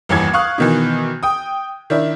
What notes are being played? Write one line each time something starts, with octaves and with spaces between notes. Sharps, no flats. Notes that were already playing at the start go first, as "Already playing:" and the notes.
G1 D#2 E3 G#6
F5 C#6 D#6 F#6
B2 D#3 E3
G5 D#6
D#3 D4 E4